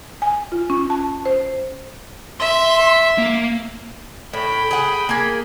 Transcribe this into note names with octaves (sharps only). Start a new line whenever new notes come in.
G#5
F4
C#4
A5
C5
E5 C6
A#3
A2 G5 B5
G#4 F#5
A#3 G#4